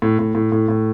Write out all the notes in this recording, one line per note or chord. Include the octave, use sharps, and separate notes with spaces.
A2
A2
A2
A2
A2